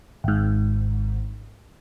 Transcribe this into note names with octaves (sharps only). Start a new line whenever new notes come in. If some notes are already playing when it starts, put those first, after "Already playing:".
G#1 G#2